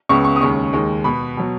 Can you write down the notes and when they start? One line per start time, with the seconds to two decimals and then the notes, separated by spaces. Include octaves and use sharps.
0.09 C#2 C#3 B3 C#6
0.24 C#6
0.36 D#6
0.40 D#2 C#3 G#3 C#6
0.73 D#2 D#3 G#3
1.04 B2 B3 B5
1.37 B2 F#3